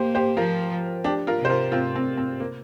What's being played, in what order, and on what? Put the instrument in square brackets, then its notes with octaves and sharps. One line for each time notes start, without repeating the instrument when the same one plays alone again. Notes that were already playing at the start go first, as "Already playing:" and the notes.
Already playing: [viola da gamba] A#3 [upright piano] G4 C5
[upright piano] G4 C5
[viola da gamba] F3 [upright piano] F4 A#4
[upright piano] D4 G4
F4 A#4
[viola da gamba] C3
[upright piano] C5
F4 A#4
C4 F4
C4
C4
A#3